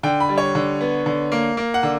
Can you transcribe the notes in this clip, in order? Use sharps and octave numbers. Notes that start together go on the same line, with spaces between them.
D3 G5
B5
G3
C#5
D3
B3
D3
A#3
A#3
F#5
D3